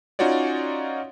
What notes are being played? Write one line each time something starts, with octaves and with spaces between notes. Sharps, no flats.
C#4 D#4 F4 F#4 C#5 D5